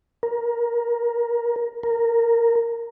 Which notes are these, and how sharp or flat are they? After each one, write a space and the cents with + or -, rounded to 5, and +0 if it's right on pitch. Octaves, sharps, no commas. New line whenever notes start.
A#4 +15
A#4 -5